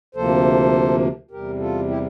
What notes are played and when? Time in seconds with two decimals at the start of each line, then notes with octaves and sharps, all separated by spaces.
0.15 D2 C3 F3 A#3 A4 C5
1.31 E2 C3 G3 G4 A#4
1.59 F4 A4
1.88 E4 G4